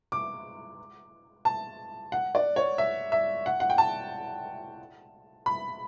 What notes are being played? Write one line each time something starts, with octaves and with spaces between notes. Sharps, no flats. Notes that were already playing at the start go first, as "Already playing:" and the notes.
D6
A5
F#5
D5
C#5
E5
E5
F#5
F#5
G5
A5
B5